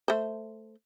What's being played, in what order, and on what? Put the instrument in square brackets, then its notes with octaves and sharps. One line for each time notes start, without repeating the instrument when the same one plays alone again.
[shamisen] A3 C5